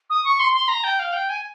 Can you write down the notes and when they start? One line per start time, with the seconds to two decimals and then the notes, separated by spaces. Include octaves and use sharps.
0.09 D#6
0.24 C#6
0.39 C6
0.53 C6
0.68 A#5
0.83 G5
0.99 F5
1.13 G5
1.29 G#5